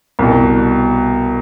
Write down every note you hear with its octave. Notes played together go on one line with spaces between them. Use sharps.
C2 B2